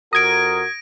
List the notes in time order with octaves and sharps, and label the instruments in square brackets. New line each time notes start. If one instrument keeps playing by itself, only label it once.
[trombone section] F2 F#4 A#4 [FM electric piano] D#6 G#6 [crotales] A#6 D7